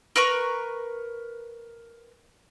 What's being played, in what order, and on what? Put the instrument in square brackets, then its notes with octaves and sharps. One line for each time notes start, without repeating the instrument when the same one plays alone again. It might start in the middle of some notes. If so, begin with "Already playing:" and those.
[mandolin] A#4 B4 A#5 C#6